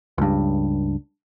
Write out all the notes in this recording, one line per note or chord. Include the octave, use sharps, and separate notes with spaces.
C#2 G2